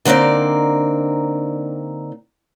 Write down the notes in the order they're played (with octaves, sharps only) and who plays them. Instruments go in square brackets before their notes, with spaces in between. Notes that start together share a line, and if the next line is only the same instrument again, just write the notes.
[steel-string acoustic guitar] D3 A#3 C4 D#4 D5